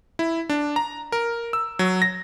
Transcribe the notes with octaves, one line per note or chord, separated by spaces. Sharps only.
E4
D4
A#5
A#4
E6
F#3
A#6